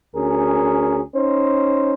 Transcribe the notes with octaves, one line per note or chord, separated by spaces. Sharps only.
D2 C#4 G#4 A#4
C#4 D#4 C5